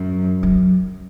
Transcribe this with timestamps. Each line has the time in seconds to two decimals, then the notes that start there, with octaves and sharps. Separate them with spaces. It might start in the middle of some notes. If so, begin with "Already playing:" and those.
Already playing: F#2
0.43 F#3